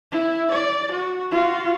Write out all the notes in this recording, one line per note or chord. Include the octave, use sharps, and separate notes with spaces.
E4
D5
F#4
F4 F#4